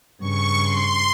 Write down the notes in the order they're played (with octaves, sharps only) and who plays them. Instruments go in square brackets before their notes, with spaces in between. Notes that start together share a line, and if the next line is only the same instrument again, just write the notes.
[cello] G2 C#3 [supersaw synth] C#6
[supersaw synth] C6